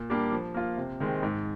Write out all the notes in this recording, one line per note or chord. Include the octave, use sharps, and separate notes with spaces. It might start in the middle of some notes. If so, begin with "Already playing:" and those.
Already playing: A#2
G3 A#3 D4 G4
F3
A#3 F4
C3
D#3 G#3 C4
G#2